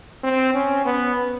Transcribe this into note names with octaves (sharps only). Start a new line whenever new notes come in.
C4
C#4
B3